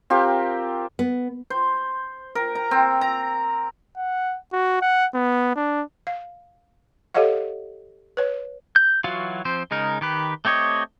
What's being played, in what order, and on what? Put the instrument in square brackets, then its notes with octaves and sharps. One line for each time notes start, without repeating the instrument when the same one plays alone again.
[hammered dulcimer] C4 F4 G4 A#4
[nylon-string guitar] B3
[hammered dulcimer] C5
A#4
A#5
C4
A#5
[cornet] F#5
F#4
F#5
B3
D4
[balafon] F5
G4 A4 C#5 D#5 F5 F#5
B4 C#5
[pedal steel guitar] G6
E3 F#3 F4 F#4 F5
F3 C4 C5
C#3 G#3 D#4 A#4
D#3 G4 B4
A3 C4 G4 C#5 D#5